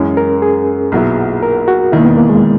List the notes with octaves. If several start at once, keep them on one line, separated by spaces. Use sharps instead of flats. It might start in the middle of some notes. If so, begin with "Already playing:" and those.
Already playing: F#2 E3 G#3 C#4
A#4
G#4
B1 A#2 F#3 B3 E4
A#4
F#4
E1 D#2 D#3 E4
A#3
B3
A#3
G#3